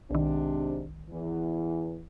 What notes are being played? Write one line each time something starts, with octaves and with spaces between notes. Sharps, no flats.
B1 G#2 C3 D#3 D4
E2 E3